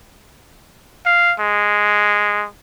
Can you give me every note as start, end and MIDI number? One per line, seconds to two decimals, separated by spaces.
1.06 1.34 77
1.40 2.46 56